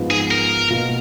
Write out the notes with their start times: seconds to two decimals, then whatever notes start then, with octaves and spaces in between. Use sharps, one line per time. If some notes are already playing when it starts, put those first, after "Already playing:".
Already playing: G#2 F3 B3 F4
0.11 G#4
0.31 A#4
0.70 B2 A#3 F4